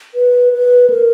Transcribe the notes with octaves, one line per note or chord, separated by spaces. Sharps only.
B4
B4
A#4